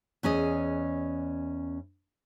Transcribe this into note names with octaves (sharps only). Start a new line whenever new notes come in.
E2 C#4 G#4 D#5